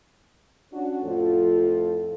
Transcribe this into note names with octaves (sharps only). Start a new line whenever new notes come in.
C#4 D4 F#4
F2 A2 F3 F4 A4